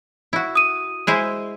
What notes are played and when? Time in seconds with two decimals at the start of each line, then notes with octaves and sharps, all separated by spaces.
0.33 E4 F#4
0.55 D#6 D#7
1.07 G#3 E4 C5